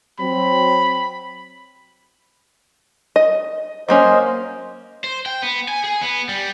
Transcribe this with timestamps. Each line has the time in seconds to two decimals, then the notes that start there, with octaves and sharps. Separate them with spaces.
0.19 F#3 C4 B5
3.16 D#5
3.89 F#3 A#3 C#4 C5 D#5
5.04 C5
5.26 G5
5.42 B3
5.68 G#5
5.84 G#4
6.01 B3
6.29 G3